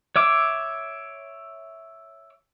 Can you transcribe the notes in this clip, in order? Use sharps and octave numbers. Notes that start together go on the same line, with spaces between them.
C#5 E5 D6